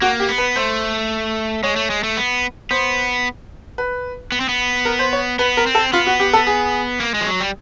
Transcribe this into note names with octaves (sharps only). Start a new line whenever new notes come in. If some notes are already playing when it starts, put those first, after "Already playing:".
A#3 F#4
G4
B3
B4
A3 C5
G#3 C#5
A3
G#3
A3
B3
B3 C5
B4
B3
C4
B3
A#4
C5
C#5
B3 B4
A#4
C4
A4
B3 F4
F#4
G4
A4
G#4
A#3
G#3
F3
F#3
G3